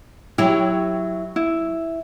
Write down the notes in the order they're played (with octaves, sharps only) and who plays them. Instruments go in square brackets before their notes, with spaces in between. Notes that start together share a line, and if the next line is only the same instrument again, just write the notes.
[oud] F#3 G4 [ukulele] E4
[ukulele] E4